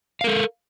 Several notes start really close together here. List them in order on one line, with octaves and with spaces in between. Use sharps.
F5 A#4 A4